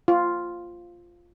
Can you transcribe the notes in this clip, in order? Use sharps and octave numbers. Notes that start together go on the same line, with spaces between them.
F4